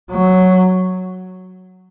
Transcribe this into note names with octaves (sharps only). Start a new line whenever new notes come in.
F#3